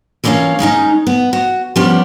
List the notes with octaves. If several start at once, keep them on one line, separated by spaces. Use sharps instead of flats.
E3 F3 A#3 C#4 C#5 F5
D#3 G#3 C#4 D#4
B3
F#4
F3 G3 B3 C#4 G4